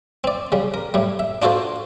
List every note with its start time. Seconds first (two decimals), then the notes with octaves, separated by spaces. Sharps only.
0.24 C4 D5
0.52 C#3 G3
0.74 A#4
0.94 A2 G3
1.19 E5
1.42 D4 F4 F#4 A4 C5